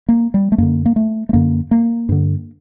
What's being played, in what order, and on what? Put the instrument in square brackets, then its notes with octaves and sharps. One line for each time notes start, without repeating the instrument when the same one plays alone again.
[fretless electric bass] A#3
G3
A3
F#2 D3 A#3
A#3
A3
A3
F#2 D3 A#3
A#3
G2 D3